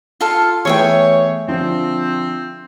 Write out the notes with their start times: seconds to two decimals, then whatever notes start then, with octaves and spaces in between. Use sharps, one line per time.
0.21 F4 A4 F5
0.65 E3 A3 B3 G#4 C#5 E5 G5
1.48 D3 F3 C4